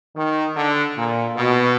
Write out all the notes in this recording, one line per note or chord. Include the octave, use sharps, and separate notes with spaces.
D#3
D3
A#2
B2